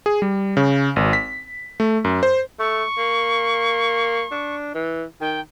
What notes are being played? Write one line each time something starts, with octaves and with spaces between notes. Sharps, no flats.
G#4
G3
C#3
G#1
B6
A3
F#2
C5
A3 C#6
A#3
D4
E3
D#3 G5